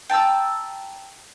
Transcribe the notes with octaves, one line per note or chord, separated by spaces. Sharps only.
G5 A5 A#5 E6